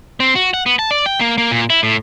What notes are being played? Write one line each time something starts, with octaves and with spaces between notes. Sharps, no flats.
C4
F#4
F#5
B3
A5
D5
G5
A#3
A#3
A#2
E4
A2